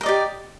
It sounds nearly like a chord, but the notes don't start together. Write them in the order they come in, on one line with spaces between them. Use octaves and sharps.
A#4 D#5 D5 G4